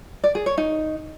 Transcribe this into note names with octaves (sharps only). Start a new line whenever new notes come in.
D5
G#4
C#5
D#4